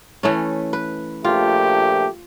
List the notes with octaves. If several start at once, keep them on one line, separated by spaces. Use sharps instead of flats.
E3 A3 C#4
B4
A#1 A3 F4 G4